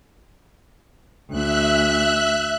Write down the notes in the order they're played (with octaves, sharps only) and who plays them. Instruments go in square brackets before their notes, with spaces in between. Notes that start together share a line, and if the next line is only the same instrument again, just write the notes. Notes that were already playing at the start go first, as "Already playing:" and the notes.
[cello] D2 [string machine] E5 F#6